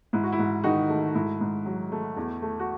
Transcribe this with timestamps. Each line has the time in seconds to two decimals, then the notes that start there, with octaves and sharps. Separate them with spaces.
0.13 G#2 E4
0.23 F#4
0.32 E4
0.39 G#2
0.64 D#3 D#4 F#4
0.90 A3
1.15 G#2 E4
1.41 G#2
1.66 F#3
1.92 A3
2.17 E2
2.42 A3
2.60 F#4